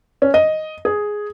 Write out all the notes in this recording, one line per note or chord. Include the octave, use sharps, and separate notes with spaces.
C#4
D#5
G#4